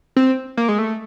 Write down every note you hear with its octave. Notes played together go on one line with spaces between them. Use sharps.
C4
A#3
G#3
A3